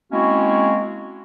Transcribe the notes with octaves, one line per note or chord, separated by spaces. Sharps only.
G#3 A#3 C4 C#4 E4 F#4